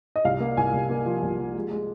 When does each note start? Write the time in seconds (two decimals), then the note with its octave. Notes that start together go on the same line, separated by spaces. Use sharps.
0.16 D#5
0.25 C2 F5
0.40 A#3
0.57 C2 G#5
0.74 C2
0.90 A#3
1.06 F3
1.22 C2
1.39 F3
1.55 G#3
1.71 G#3